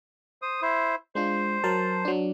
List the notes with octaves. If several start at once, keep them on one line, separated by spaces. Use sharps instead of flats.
C5 D#6
E4 C5
G#3 D4 F4 C5
F#3 A#4 A5
F#3 D4